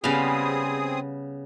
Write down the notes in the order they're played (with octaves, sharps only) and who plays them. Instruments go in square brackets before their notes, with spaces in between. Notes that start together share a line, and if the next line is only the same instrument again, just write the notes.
[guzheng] C#3 F5 [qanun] G3 B3 [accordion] C4 G#4 D#6